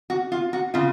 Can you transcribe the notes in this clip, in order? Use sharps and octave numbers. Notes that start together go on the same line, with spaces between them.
F#4
F4
F#4
C#3 F4